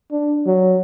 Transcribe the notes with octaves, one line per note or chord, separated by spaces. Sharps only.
D4
F#3